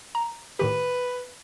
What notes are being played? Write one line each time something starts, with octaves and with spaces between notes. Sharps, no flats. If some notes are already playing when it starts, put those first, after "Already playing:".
A#5
A2 D#3 G4 B4